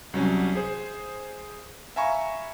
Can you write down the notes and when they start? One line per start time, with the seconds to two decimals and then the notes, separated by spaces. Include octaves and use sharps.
0.14 C2 F#3 C#4
0.55 G#4 C5
1.96 E5 F5 G#5 A#5 B5 C#6